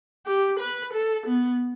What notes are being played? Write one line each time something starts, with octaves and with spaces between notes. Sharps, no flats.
G4
B4
A4
B3